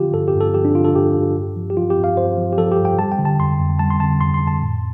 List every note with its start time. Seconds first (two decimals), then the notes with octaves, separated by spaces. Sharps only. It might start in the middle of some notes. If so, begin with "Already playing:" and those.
Already playing: D3 F3 F4 G4
0.14 G2 A4
0.28 G4
0.35 G2
0.41 A4
0.54 F3 G4
0.65 D4
0.75 D3 F4
0.85 A4
0.95 G2 G4
1.15 G2
1.36 G2
1.56 F3
1.70 G4
1.77 F3 F4
1.90 G4
1.97 G2
2.04 F5
2.17 G2 C5
2.38 F3
2.53 G4
2.58 F3 A4
2.72 G4
2.78 G2
2.85 G5
2.98 G3 A5
3.12 G5
3.19 D3
3.25 A5
3.39 F2 C6
3.59 F2
3.79 G3 A5
3.90 C6
4.00 D3 A5
4.21 F2 C6
4.34 C6
4.40 F2
4.47 A5
4.61 A2